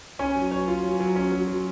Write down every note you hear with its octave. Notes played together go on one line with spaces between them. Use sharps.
C#4 G#5
F#3
F#3 C#5
F4
F#3
F#3
C#4
F#3
F#3